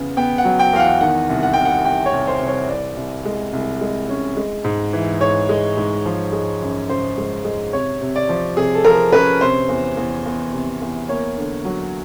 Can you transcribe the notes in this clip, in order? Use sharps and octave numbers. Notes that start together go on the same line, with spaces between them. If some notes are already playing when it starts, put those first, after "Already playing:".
Already playing: E2 C#3 B3
B3 G5
F#5
F#3
G5
E2 F5
F#5
D#3 F#5
C2
F#5
C3 G5
F#5
C2 G5
C#5
C2
C5
C2
C#5
C2 D5
C2
G#3
C2
G#3
C#4
G#3
G#2
E3
G#2 C#5
G#3
G#2
F3
G#3
F#2
C#3 C5
G#3
G#3
C3 C#5
C3
D5
F3
C3 G#4
A4
F3 A#4
C#4 B4
C3 C5
E2
E2
E2
C3
E2
A#3 C#5
D3
F#3